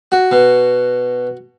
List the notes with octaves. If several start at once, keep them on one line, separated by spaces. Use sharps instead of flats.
F#4
B2